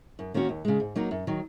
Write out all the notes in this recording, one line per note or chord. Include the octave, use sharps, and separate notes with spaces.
F#2
D#3 A#3 C#4 F#4
D#2
C#3 G#3
G#2
F#3 A#3 D#4 F#4
F#2
D#3 F#3